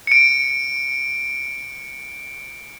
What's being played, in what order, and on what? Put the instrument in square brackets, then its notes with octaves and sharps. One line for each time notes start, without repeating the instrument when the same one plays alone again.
[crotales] C#7 D7